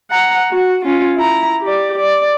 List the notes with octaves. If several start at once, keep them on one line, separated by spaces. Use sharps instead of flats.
F#5 A#5
F#4
C#4 F4
E4 A#5
G4 D5
D5